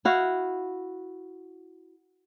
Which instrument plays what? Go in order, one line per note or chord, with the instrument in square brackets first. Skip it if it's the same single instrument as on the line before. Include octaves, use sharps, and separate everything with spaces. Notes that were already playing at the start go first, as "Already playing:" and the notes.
[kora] E4 F#4 F5